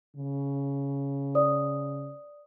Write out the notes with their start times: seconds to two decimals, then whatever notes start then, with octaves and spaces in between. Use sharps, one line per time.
0.16 C#3
1.35 C5 D5 D#6